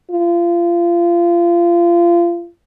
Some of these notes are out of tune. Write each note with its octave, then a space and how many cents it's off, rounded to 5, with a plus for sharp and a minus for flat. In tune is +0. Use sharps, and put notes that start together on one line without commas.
F4 -25